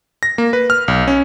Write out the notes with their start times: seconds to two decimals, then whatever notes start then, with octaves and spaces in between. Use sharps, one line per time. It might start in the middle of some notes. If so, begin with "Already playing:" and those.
0.23 A#6
0.38 A#3
0.53 B4
0.70 F6
0.88 B1
1.08 C#4